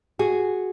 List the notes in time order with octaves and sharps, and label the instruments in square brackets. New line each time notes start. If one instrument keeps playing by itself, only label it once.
[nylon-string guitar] F#4 G#4